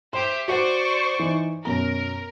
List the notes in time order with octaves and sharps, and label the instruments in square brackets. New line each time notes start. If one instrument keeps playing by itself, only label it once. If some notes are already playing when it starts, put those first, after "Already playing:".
[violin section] G4 C5 E5 [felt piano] C6
[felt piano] F#4 F#5 [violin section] C5 D5 C#6
[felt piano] E3 D#4
[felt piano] F#2 B2 A#5 [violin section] A#4